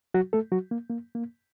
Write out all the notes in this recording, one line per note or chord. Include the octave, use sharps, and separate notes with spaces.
F#3 F#4
A3 A4
F#3 F#4
A#3
A#3
A#3